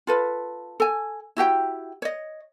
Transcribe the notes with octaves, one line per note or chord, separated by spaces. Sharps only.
F4 A4 B4
A4 G#5
E4 F#4 G4 G5
C#5 D#5